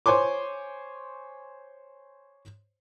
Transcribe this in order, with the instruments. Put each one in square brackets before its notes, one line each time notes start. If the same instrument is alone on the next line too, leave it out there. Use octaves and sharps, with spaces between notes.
[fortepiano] C5 C#5 G#5 C6 D6